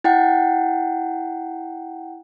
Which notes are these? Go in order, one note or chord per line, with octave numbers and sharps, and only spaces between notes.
E4 F#5 G5